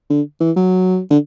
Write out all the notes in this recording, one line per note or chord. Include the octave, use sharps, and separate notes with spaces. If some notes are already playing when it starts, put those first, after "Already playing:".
D3
E3
F#3
D3